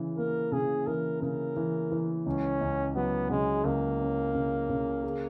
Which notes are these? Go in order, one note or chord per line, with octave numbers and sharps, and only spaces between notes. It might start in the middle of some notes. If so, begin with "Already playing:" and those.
Already playing: C#3 E3
A#3 A#4
C#3 G#4
E3 A#4
C#3 A#4
E3
E3
C#2 C#4
C#2
F#3 B3
C#3 G#3
C#2 A#3
C#4
C#3
C#3
G#4